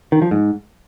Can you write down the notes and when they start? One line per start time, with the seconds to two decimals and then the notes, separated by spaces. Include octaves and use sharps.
0.12 D#3
0.22 F3
0.31 G#2